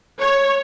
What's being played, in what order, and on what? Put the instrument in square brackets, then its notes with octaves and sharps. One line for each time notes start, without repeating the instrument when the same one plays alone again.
[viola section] C#5